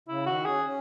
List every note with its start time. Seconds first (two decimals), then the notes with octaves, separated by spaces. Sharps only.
0.08 C#3 E4
0.26 D#3 F#4
0.45 C#4 G#4
0.64 C#4